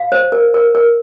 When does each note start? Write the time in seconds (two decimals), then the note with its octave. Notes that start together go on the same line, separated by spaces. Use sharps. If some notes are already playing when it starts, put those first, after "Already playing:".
Already playing: F5
0.12 C5
0.32 A#4
0.54 A#4
0.75 A#4